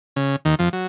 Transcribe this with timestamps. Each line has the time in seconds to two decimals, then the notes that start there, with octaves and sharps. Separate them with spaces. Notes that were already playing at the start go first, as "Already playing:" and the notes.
0.16 C#3
0.45 D#2 D#3
0.59 F2 F3
0.73 F#3